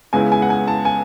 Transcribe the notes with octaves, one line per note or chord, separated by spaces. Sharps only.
C#2 C#3 G#3 B3 E4 G#5
G#5
F#5
G#5
A5
G#5